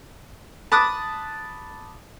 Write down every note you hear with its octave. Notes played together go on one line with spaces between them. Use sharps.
A5 B5 D6 D#6 F#6